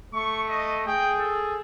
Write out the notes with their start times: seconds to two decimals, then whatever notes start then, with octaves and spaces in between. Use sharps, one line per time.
0.13 A3 C#6
0.49 D#5
0.87 G#4 G5
1.19 A4